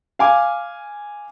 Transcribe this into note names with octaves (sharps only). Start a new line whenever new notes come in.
F5 G#5 D6